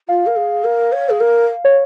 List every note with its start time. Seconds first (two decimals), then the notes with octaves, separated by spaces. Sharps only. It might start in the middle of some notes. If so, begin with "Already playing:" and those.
0.08 F4 F5
0.26 A#4
0.36 G#4
0.64 A#4
0.92 C#5
1.09 G#4
1.20 A#4
1.65 C#5